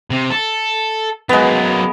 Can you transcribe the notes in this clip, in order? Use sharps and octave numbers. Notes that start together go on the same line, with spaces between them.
C3
A4
F#3 G#3 A#3 B3